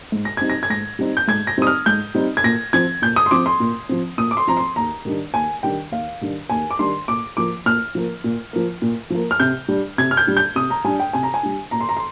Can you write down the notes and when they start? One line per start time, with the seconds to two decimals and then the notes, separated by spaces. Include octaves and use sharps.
0.12 G#2
0.25 A#6
0.37 G3 C4 D#4 G#6
0.50 A#6
0.63 G#6
0.70 G#2 A#6
0.99 G3 C4 D#4
1.17 G6
1.28 G#2 G#6
1.47 A#6
1.57 G3 C4 D#4 D#6
1.67 F6
1.86 G#2 G6
2.15 G3 C4 D#4
2.37 G#6
2.44 A#2 A#6
2.73 F3 C4 G#6
3.02 A#2 G6
3.16 D#6
3.26 C6
3.31 F3 C4 D6
3.46 C6
3.60 A#2
3.89 F3 C4
4.18 A#2 D#6
4.31 D6
4.37 C6
4.47 F3 C4 A#5
4.57 C6
4.76 D#2 A#5
5.05 D#3 G3 D4
5.34 D#2 G#5
5.63 D#3 G3 D4 G5
5.92 D#2 F5
6.21 D#3 G3 D4
6.50 D#2 G#5
6.71 D6
6.79 D#3 G3 D4 C6
7.08 A#2 D6
7.37 F3 A#3 D6
7.66 A#2 F6
7.95 F3 A#3
8.24 A#2
8.53 F3 A#3
8.82 A#2
9.10 F3 A#3
9.31 F6
9.40 C3 G6
9.68 G3 D4
9.98 C3 G#6
10.11 F6
10.17 G6
10.27 G3 D4
10.37 G6
10.56 C3 D#6
10.70 A#5
10.84 G3 D4 G#5
11.00 G5
11.13 C3 G#5
11.23 A#5
11.34 G#5
11.43 G3 D4
11.71 A#2 A#5
11.80 C6
11.89 A#5
11.97 C6